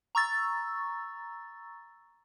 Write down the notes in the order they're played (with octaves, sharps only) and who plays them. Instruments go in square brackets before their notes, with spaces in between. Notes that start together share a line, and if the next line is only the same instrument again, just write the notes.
[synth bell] A#5 C#6 E6 A6